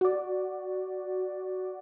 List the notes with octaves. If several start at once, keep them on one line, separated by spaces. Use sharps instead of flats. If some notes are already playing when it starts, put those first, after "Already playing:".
F#4 D5